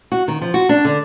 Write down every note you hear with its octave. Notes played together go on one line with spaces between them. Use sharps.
F#4
D#3
F3
F#4
D4
D3